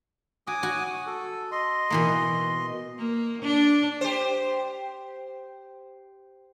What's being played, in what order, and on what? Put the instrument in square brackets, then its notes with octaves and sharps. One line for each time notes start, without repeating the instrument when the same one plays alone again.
[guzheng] F#4 [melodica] G#5 D6 D#6
[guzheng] F#4
[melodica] A4
D#5 C6
[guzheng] B2 E3 A#3
[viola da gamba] A#3
D4
[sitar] G4 C5